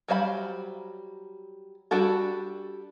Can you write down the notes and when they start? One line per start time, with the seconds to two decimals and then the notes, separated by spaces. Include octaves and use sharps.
0.08 F#3 G3 C5 F5 B5
1.91 G3 D4 F#4 A4